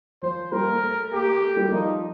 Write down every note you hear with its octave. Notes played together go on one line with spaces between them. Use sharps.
F3 C5
G3 A#4
A#3
A3
A3
A#3 G4
A3
A3
G3
G3
F3 D#4